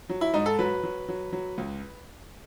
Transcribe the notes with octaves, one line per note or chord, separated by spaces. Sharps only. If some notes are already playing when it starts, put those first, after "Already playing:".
F#3
E4
G#2 D#4
A4
F#3 B4
F#3
F#3
F#3
C#2